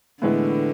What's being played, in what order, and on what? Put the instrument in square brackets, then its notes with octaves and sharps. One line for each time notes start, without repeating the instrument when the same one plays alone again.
[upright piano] A2 E3 G#3 B3 E4 [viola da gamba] D3